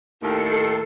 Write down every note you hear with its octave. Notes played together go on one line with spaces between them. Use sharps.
D#2 A2 D#3 A4 C7 C#7